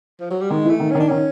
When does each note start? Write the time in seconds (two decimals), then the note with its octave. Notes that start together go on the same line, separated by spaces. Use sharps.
0.20 F3
0.30 F#3
0.41 G3
0.50 D#3 G#3
0.65 E3
0.69 A3
0.80 D#3
0.91 C#4
0.95 D#3
1.00 D4
1.08 D#3 C#4